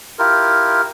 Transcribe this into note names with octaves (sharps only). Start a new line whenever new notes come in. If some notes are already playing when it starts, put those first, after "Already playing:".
E4 F4 G4 A#4